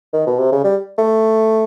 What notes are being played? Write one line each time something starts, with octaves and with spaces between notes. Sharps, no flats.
D#3
B2
C3
C#3
G3
A3